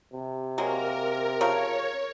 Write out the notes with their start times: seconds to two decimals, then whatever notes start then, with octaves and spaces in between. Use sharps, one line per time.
0.13 C3
0.58 F#3 G#3 A#3 A#4
1.41 C#3 F3 A#4 C#5